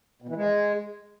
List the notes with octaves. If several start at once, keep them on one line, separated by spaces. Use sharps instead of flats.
B2
E3
G#3